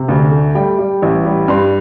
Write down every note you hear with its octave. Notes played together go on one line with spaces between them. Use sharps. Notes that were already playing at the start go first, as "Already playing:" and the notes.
Already playing: C3
D2
A3
G3 G5
G3
A1
G3
G2 C6